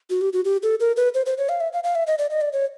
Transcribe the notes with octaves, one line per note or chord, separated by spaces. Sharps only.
F#4
G4
F#4
G4
A4
A#4
B4
C5
C5
C#5
F5
E5
F5
F5
E5
D#5
D5
D#5
D5
C#5